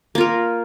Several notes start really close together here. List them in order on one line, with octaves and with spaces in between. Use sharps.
A#3 F4 A#4